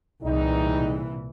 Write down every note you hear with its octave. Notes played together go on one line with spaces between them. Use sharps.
C2 A#2 E3 G3 G#3 D#4